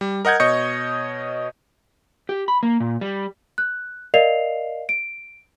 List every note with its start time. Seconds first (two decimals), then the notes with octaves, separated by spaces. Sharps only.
0.01 G3
0.25 A#4 D#5 F#5 G6 G#6
0.40 B2 C#5 D#5 C#6 G6 C#7
2.29 G4
2.48 B5
2.63 A#3
2.80 A#2
3.01 G3
3.58 F#6
4.14 A#4 D5 D#5 F5 C7 F7
4.89 D7